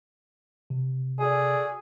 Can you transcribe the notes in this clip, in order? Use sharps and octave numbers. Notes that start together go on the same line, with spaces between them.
C3
F#4 G#4 A4 D5